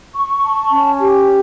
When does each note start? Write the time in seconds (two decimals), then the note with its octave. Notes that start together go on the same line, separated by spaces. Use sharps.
0.15 C#6
0.43 A5
0.71 C#4
1.00 G4